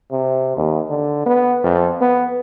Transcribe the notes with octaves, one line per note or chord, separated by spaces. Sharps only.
C3
D#2
D3
B3
F2
B3